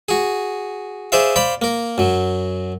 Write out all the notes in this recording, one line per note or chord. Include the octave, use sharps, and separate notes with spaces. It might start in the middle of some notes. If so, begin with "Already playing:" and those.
F#4 G#4
G#4 C5 D5 E5 F5
C5 D5 F5 B5
A#3 A#4
F#2 F#3